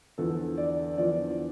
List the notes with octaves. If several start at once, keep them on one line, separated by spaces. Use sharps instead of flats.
E2 D3 F3 A4
D5
E2 D3 F3 D5